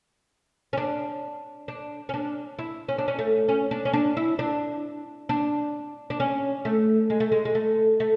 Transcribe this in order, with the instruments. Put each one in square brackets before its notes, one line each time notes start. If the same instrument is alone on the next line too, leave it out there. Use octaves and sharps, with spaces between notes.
[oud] C#4
D4
D4
C#4
D4
E4
C#4
D4
C#4
A3
C#4
D4
C#4
D4
E4
D4
D4
D4
C#4
A3
G#3
A3
G#3
G#3
A3
A3